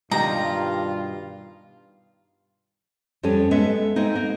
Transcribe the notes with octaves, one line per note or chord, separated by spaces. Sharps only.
G2 B2 D#3 G3 F4 A#5
F2 G3 C#4 A4 G#5
G#3 B3 A4 E5
G#3 A#3 C4 D#4
A#3